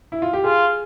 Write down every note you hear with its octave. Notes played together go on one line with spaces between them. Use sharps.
E4
F4
G4
F4 G#4